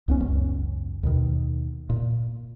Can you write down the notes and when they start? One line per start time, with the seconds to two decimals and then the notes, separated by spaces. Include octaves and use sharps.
0.08 C#2 B3 C#4
0.20 G#1 C#2 F#2
1.03 D#2 B2 D#3
1.90 A#2